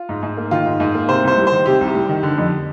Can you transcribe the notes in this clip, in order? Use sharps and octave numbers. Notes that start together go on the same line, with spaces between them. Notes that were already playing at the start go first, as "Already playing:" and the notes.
Already playing: F4
G#2
G#2
A#3
D#3 F4
G#2
G#2
A#3
C3 C5
C2 C5
G3
C5
D#3
C3 G4
C2
G3
D#3
D3
F2